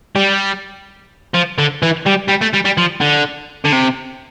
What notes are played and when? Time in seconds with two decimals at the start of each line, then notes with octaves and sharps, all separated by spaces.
0.16 G3
1.34 F3
1.58 D3
1.83 E3
2.06 G3
2.29 G3
2.42 A3
2.54 G3
2.65 G3
2.78 F3
3.01 D3
3.65 D3
3.73 C3